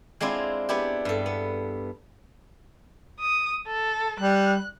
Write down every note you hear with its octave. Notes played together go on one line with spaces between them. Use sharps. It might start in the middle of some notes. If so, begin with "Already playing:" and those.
G#3 C4 D4 E4 F4
B3 D4 E4 G4
G2 A4
B3
D#6
A4
G3 F#6